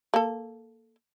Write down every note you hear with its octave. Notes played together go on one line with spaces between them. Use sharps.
A#3 A4